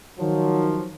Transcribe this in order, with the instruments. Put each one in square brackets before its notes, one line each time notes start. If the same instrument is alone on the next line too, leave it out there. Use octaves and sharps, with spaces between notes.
[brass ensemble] D#3 F3 F#3